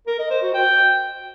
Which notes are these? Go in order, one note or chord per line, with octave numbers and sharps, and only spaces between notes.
A#4
D#5
C5
F#4
G5